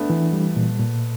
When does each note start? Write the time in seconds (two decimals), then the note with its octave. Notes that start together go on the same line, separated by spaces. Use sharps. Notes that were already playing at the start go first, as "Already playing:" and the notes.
Already playing: A3 B3 D4
0.10 E3
0.33 G3
0.56 A#2
0.79 A#2